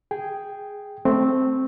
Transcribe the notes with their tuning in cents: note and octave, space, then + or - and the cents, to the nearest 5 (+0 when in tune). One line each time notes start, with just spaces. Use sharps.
G#4 +0 G5 +0
A3 +0 C4 +0